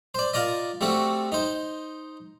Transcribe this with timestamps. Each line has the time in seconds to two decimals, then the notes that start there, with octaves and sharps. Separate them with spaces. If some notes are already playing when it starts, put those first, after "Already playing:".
0.14 C5 D5
0.34 F4 A#4 D5 D#5
0.81 G3 A3 C4 F#4
1.32 D#4 C5